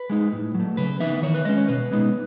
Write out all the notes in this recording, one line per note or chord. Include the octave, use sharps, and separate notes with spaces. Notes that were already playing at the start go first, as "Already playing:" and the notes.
Already playing: B4
G#3 D#4
A2
F#3 A3
C#3 B4
E3 B3 D#4 E5
D#3 C#5
B4
G#3 C#4 D#5
C#5
B2 B4
G#3 B3 D#4